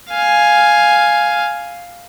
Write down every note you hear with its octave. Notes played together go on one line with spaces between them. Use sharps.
F5 G#5